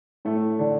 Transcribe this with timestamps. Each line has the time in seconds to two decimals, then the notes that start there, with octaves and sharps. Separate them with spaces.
0.25 A2 A3
0.59 D3 D4